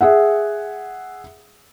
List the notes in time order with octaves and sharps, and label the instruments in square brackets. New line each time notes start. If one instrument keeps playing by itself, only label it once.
[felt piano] G#4 E5 F#5